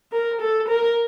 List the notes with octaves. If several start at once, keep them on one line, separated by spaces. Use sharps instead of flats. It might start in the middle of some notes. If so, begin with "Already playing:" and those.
A#4
A4
A#4